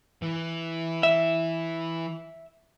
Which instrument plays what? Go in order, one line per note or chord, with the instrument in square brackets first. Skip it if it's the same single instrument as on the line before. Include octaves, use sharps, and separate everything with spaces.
[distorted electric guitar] E3
[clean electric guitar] E5